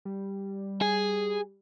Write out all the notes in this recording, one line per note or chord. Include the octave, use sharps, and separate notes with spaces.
G3
G#4